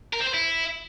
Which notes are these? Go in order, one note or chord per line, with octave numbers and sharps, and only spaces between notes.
A#4
C4
C5
E4